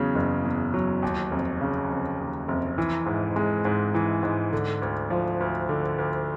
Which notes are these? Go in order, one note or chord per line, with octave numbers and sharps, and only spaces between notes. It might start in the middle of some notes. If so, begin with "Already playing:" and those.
Already playing: E2 C#3 F#3
F#1
E2
F#3
D#2
F1
C#3
F1
D#2
F1
E3
G#2
G#3
G#2
E3
G#2
D3
D2
F3
D2
D3
D2